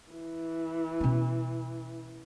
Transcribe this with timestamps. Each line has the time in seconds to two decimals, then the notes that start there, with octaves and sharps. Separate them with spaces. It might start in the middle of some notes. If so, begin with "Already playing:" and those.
0.13 E3
1.00 B2 C#4